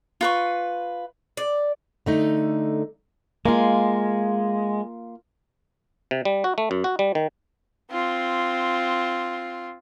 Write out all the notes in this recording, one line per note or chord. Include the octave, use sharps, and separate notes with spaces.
F4 B4 C#6
D5
D3 A3 D#4
G#3 A#3 F4
C3
G3
F#4
A3
F#2
F#4
G3
D#3
C4 F4